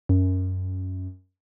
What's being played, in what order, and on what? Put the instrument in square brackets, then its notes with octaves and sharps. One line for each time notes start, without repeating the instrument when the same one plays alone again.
[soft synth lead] F#2